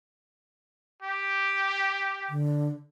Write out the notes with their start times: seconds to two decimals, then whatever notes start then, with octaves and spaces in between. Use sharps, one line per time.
1.02 G4
2.29 D3